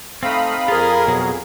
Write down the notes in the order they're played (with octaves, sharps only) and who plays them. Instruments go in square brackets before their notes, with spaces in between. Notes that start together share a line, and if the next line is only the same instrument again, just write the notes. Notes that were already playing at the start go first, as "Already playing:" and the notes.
[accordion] A3 [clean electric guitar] C4 D#4 [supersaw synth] F5 B5 D#6
[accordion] F2 G#4 [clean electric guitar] F4 [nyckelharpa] A#4
[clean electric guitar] B2 F#3